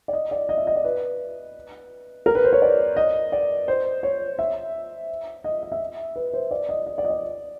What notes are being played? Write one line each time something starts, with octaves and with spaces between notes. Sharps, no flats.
D5
D#5
D5
D#5
E5
D#5
D5
B4
A#4
B4
C5
C#5
D5
D#5
D5
C5
C#5
E5
D#5
D#5
E5
B4
C5
D5
D#5
D#5
D5
D#5
D5